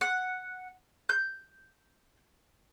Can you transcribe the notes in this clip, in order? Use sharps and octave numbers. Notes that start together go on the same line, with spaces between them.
F#5
G6